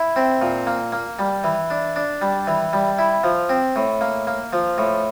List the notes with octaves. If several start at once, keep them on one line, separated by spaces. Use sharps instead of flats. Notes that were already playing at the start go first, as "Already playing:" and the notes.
Already playing: E4
C4
A#2
A#3
A#3
G3
E3
D4
D4
G3
E3
G3
E4
F3
C4
A2
A#3
A#3
F3
A2